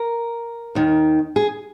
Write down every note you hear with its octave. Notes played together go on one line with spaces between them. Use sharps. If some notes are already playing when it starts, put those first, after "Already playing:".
Already playing: A#4
D#2 D#3
G#4